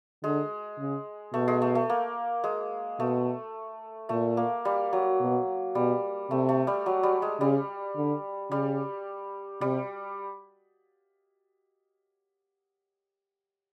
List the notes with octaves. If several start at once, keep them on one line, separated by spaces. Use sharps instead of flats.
D3 G#3
C#3
B2 A3
G#3
A3
A3
A#3
G#3
B2 A3
A#2 A3
A#3
G3
F#3
B2
B2 G3
C3 A3
A3
G3
F#3
G3
G#3
C#3 G3
D3
C#3 G3
C3 G3